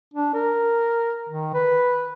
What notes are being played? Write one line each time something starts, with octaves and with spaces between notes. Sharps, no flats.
D4
A#4
D#3
B4